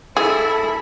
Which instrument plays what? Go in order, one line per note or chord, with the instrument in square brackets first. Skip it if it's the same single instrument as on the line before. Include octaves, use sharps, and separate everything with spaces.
[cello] E4 [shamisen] G#4 [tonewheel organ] A4